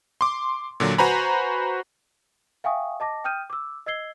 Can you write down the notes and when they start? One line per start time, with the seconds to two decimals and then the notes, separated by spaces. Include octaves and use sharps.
0.21 C6 D6
0.80 A#2 D3 F#3
0.98 F#4 B4 C5 G#5 A#5 B5
2.64 E5 F5 G5 G#5 C#6 D#6
3.00 D#5 A5 D6 A#6
3.24 G5 D#6 F6 G6 D#7
3.50 D6 E6
3.86 D#5 E6 G#6 C7 G7